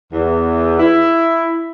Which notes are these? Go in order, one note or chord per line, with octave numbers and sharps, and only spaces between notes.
E2
E4